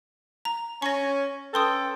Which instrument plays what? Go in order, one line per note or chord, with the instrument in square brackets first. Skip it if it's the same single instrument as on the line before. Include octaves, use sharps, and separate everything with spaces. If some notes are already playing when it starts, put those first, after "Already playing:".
[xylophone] A#5
[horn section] C#4 G#5 [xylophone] C#6 A#6
[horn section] C#4 A4 G5 [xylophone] B4 C6 D#6